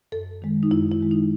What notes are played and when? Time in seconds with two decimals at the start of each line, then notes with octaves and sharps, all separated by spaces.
0.12 F#2 A4
0.42 D#3 G#3
0.63 D#4
0.71 F#2 E4
0.91 E4
1.01 D#3 G#3
1.11 D#4